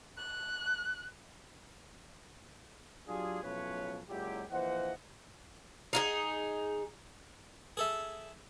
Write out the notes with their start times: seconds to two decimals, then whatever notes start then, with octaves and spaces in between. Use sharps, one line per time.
0.18 F#6
3.08 F#3 D4 F4 G4 G#4
3.43 B1 A2 F3 C#4 B4 C#5
4.09 F#1 A#2 F#3 G#3 E4 G4
4.51 A#1 E3 A#3 C5 D#5 F#5
5.93 D#4 E4 G#4
7.77 G#4 A4 E5